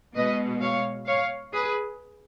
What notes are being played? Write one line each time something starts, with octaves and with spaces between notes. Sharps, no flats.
B2 G#3 B4 D#5
C#5 F5
C#5 F5
G#4 B4